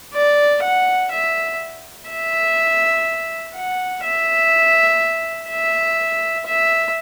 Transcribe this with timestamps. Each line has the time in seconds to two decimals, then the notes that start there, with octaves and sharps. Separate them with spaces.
0.14 D5
0.63 F#5
1.12 E5
2.09 E5
3.55 F#5
4.03 E5
5.49 E5
6.46 E5